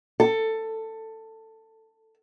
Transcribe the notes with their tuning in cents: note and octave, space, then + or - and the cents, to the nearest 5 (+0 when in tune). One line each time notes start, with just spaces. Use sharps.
A4 +15